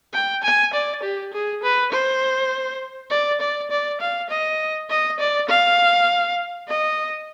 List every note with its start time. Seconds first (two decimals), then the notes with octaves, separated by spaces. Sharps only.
0.13 G5
0.43 G#5
0.73 D5
1.02 G4
1.33 G#4
1.62 B4
1.92 C5
3.10 D5
3.41 D5
3.71 D5
4.01 F5
4.29 D#5
4.90 D#5
5.19 D5
5.49 F5
6.68 D#5